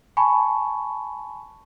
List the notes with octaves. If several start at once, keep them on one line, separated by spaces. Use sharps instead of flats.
G#5 A5 B5 C#6